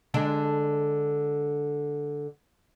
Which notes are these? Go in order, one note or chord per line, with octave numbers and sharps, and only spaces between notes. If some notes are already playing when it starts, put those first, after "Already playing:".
D3 G#3 D4